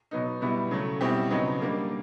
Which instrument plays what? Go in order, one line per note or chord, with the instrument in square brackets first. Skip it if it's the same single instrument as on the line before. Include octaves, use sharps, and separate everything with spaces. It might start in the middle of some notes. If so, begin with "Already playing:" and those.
[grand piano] B2 F#3 B3 D#4
B2 G3 B3 E4
C#3 F#3 A3
B2 G3 C4 E4 G4
C#3 F#3 B3 D#4
G3 A#3 D4